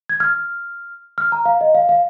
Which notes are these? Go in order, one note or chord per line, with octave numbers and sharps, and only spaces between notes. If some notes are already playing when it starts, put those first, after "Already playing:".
G#6
F6
F6
A#5
F5
D#5
F5
F5